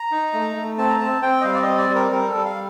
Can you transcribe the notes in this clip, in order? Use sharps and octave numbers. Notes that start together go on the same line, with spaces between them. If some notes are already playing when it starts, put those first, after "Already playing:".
Already playing: A#5
D#4
A3
A3
C4 A5
A#5
C4 A5
C4 G5
D#5
G3 F5
D5
D#5
C4
D5
G3
A#4
G3 A#4
A4
G3
F5